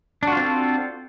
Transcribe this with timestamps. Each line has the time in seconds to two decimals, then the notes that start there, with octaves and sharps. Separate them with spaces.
0.23 D4
0.27 F#4
0.32 F4
0.37 C4
0.42 A4